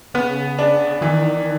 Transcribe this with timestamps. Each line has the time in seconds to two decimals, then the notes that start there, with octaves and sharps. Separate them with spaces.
0.14 C#3 B3
0.59 D4
1.01 D#3 E3